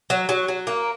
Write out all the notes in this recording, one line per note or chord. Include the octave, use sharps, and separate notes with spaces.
F#3
F#3
F#3
A#3